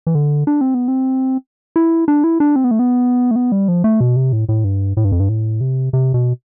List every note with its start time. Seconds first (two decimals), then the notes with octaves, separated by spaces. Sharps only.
0.07 E3
0.15 D3
0.47 D4
0.61 C4
0.74 B3
0.88 C4
1.76 E4
2.08 D4
2.24 E4
2.40 D4
2.56 C4
2.64 B3
2.71 A3
2.79 B3
3.31 A3
3.36 B3
3.52 G3
3.68 F3
3.84 A3
4.00 B2
4.16 C3
4.33 A2
4.49 A2
4.64 G2
4.97 A2
5.05 G2
5.12 F2
5.20 G2
5.29 A2
5.61 C3
5.93 C3
6.14 B2